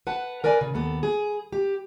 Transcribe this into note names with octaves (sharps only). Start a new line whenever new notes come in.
B4 F#5 A5
A#4 B4 D5 G#5
C#3
D#2 B3 A4
G#4
G4